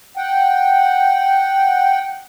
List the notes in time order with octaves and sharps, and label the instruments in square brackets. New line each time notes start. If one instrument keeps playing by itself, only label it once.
[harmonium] F#5 G5